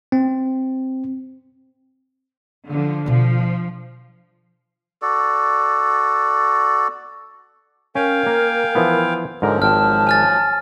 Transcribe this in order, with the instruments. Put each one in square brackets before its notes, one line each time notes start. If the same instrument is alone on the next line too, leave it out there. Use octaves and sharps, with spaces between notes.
[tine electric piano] C4
[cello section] D3 F3
[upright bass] B2 D4 [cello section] F3
[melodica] F#4 A4 D5
[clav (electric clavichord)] C#4 [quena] A#4 [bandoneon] F5 G5 G#5
[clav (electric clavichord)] A#3
E3 F3 B3
[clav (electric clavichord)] G#2 D3 A#4 [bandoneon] F3 F#3
[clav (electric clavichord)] G#1 G5 [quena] A5 [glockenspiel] F6
[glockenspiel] G#5 F6 A6